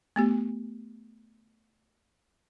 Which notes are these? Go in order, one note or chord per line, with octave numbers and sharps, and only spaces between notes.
A3 B3 G4